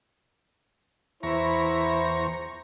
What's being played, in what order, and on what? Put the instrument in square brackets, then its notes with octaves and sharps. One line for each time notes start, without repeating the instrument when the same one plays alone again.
[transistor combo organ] E2 A#5 C#6 [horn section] E4 [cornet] C5